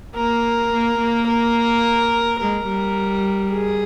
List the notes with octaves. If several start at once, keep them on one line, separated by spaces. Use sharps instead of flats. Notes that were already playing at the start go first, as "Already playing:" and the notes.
A#3 A#4
A#3
A#3
A#4
G#3 A#4
G3
G#4